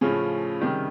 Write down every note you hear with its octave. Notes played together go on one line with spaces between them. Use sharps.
A2 C#3 F3 C#4
C3 D#3 G3